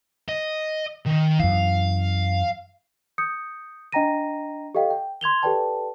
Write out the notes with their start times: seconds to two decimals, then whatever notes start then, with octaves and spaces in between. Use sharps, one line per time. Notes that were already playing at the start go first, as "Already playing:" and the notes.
0.28 D#5
1.06 D#3
1.40 F#2 E3 F5
3.18 D#6 G6 C#7
3.92 D4 D#5 G5 A#5 A#6 D#7
4.75 G4 A4 D#5 F5 G5
4.90 G5
5.21 C6 G#6 F7 G7
5.43 G4 A4 B4 D5 G5 A5